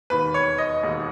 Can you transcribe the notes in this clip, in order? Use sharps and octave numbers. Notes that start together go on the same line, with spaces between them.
E1 D#2 D#3 B4
C#5
D#5
E1 D#2 D#3